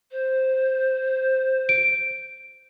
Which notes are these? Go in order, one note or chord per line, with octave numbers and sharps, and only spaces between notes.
C5
D7